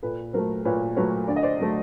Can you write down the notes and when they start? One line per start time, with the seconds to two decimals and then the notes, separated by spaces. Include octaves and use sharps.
0.02 A#2 A4 B4
0.33 F#3 A3 A#4 C5
0.65 A#2 B4 C#5
0.97 F#3 A3 B4 C#5
1.28 D3 D5
1.36 D#5
1.43 C5 D5
1.60 F#3 A3